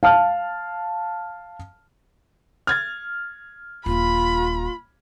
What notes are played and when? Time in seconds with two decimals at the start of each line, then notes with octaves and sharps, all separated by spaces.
0.03 F5 A5 F6
2.67 F6 G#6 A6
3.86 D#1 F4 B5